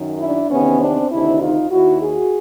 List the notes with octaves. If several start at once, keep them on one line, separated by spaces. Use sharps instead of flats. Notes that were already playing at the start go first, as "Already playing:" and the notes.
Already playing: F#2 D#3
D4 E4
E2 C3 D#3 B3 C#4
C4 D4
D2 C3 D#3 D4 E4
D#4 F4
D#2 D#3 E4 F#4
F#4 G#4